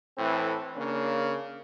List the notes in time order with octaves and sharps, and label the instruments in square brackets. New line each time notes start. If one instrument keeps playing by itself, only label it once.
[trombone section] A2 E3 C4 A4
C#3 A#3 C#4 D4